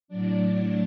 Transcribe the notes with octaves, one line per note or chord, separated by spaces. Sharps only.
A2 F#3 D4 D5